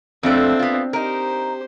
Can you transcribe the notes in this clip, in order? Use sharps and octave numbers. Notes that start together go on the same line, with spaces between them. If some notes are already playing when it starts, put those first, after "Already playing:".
F2 F3 A3 C4 D4
B3 F4
D#4 G4 A#4 C5